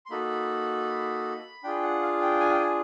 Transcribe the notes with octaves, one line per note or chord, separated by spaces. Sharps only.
C6
A#3 D#4 F#4 A4 B5
D4 F4 G#4 G5
F#5
F5
G5
G#5
G5
G#5